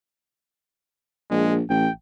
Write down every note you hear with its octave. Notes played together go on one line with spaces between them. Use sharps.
A#1 G#3
A1 G5